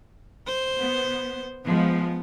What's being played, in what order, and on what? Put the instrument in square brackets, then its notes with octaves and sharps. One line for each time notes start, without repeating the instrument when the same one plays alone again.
[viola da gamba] C5
[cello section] B3
[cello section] F3 G#3 [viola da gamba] B3